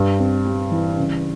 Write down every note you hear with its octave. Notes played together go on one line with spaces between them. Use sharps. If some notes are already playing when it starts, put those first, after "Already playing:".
Already playing: G2
C4
G3
E3
C#3